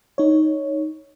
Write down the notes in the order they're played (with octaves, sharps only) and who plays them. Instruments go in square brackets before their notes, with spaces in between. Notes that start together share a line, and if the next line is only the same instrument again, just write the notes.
[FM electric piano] D#4 C#5